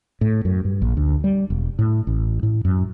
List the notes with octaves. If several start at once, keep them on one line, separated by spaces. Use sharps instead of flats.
A2
F#2
G2
A#1
D2
G3
E1
A2
A1
A2
F#2